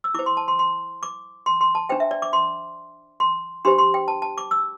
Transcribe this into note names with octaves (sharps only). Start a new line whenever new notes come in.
E6
E4 C5 D6
C6
A5
C6
C6
D6
C6
C6
A5
D4 C5 G5
E5
D5
D6
C6
C6
D4 G4 C5 C6
C6
G5
A5
A5
D6
E6